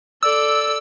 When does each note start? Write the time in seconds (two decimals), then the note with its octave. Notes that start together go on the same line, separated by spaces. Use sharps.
0.23 A4 D5 E6